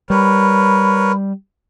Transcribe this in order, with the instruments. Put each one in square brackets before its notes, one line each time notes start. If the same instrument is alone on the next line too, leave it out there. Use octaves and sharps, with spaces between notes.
[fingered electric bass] G3 [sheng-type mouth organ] A#4 B4 C#5 [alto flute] B5